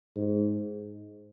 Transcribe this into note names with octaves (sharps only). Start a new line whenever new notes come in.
G#2